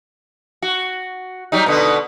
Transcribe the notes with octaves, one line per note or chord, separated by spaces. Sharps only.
F#4
F#3 G3 D#4
B2 D3 B3